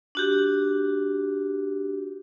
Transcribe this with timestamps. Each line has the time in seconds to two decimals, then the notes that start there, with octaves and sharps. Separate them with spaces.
0.15 D4 F#4 G4